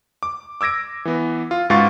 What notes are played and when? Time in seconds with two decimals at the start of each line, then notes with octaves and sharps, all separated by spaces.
0.23 D6
0.61 D6 E6 G#6 A#6 D7
1.05 E3 B3
1.51 F4
1.70 C#2 G#2 F4 F#4 C#6 A6